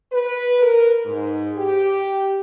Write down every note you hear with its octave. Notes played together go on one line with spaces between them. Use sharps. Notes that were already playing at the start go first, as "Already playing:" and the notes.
B4
A#4
G#2
G4